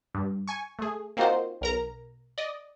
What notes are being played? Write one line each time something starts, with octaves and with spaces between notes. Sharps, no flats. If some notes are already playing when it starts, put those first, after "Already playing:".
G2
G#5 C#6
A3 G#4
A#3 C4 D#4 F4 F#4 C5
B1 A#4 A#5
D5 D#5